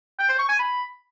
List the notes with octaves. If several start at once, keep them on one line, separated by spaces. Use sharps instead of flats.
G5
C5
C#6
G#5
B5